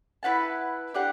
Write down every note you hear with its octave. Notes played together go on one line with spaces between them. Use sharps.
E4 B4 F#5 A5
D4 G4 D5 F#5